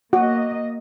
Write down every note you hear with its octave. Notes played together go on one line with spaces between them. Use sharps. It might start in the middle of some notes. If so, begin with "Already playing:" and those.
A#3 F#4 D#5